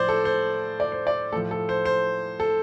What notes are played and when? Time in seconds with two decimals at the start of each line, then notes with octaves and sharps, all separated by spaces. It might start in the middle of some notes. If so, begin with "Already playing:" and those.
Already playing: A2 F3 C5 D5
0.09 A4
0.25 C5
0.80 D5
0.92 C5
1.07 D5
1.32 A2 A4
1.36 F3
1.51 A4
1.69 C5
1.85 C5
2.40 A4